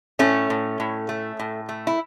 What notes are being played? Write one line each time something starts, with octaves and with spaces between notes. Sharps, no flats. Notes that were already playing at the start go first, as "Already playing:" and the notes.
A2 A3 C#4
A2
A2
A3
A2
A3
E4